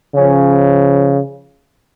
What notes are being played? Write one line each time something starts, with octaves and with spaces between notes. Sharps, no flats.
C#3 F3 C#4